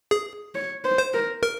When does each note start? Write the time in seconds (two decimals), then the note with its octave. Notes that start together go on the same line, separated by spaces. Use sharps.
0.11 G#4
0.55 C#5
0.84 C5
0.98 C5
1.13 A#4
1.43 A#4